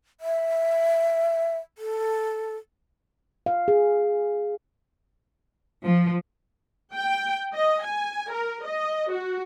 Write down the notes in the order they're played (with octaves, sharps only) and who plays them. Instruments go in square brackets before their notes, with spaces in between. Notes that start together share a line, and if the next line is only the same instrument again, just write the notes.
[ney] E5
A4
[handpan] F5
G#4
[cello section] F3
[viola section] G5
D#5
G#5
A#4
D#5
F#4